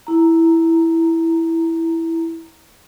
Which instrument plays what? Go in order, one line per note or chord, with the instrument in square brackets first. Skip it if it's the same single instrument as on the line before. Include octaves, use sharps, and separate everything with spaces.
[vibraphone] E4 A#5